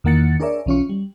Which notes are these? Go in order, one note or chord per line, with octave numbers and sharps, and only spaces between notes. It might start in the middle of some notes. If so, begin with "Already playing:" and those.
E2 D#3 A#3 F#5 A6 C#7
D4 G#4 A#4 C#5 D5 E5
B1 E3 C#4 F4 C#6
G3